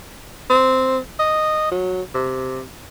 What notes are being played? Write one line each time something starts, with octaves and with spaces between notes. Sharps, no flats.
C4
D#5
F#3
C3